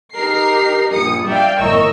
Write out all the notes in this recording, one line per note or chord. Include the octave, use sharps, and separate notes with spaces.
D#4 G4 A#4 C7
A#1 G2 D#6 C#7
D5 E5 F5 G5
G1 A2 A#4 D#5 C#6 E6